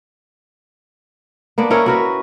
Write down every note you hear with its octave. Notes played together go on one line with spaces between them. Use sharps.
A#3 B3 D4
C#4 E4 A#4 C#5
F#4 A#4 B4